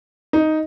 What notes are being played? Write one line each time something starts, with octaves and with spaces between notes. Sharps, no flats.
D#4